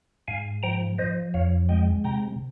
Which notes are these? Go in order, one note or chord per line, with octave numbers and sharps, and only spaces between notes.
G#2 F5 G#5
F3 G5 A#5
F3 C5 D#5
F2 C#5 F5
G#3 D#5 G5
C3 G5 A#5